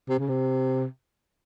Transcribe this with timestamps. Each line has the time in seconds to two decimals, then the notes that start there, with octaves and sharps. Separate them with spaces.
0.09 C3
0.19 C#3
0.29 C3